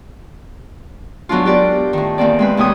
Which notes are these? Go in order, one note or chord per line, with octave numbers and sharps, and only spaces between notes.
G#2 F#3 B3 D4 F4
F4 G4 A#4 D5
A2 D#3
E2 A#3 C4 D5
G#3 C4 B4
D#2 C3 B3 C#5 D#6 G6